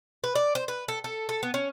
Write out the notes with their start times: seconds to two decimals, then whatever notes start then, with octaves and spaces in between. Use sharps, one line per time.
0.24 B4
0.35 D5
0.55 C5
0.68 B4
0.88 A4
1.04 A4
1.29 A4
1.43 B3
1.54 C#4